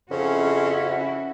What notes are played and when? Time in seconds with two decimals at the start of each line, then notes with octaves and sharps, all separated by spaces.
0.11 F2 C#3 C#4 E4 F#4